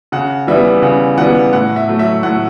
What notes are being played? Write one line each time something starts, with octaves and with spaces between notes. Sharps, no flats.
C#3 F#5
E3 G3 B3 E5
C#3 F#5
E3 G3 B3 F#5
A2 F#5
E5
F#3 A3
E5
A2 F#5